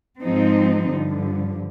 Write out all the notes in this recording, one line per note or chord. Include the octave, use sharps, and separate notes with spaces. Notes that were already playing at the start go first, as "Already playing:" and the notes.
G#2 F3 G#3 C4 D#4
G2 D3 F3